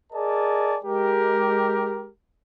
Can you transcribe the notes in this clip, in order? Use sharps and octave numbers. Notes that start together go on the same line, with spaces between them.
G#4 A#4 D5 D#5 G#5 A5
G#3 G4 A#4